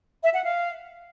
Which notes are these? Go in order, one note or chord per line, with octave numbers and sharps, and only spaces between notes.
E5
F#5
F5